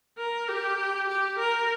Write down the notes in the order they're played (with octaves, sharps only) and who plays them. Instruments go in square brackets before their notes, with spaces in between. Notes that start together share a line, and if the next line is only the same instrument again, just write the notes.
[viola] A#4
G4
G4
A#4